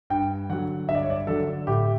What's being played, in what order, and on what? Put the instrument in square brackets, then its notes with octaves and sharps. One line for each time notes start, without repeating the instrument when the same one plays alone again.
[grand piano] G2 G5
D3 F#3 F#5
G2 E5
D5
C#5
D5
D3 F#3 A4
A2 G4